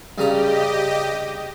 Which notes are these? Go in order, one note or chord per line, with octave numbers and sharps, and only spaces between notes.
G2 C#3 G4 D#5 A#5